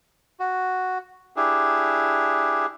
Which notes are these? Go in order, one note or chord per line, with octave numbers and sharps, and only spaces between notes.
F#4
D4 E4 G4 G#4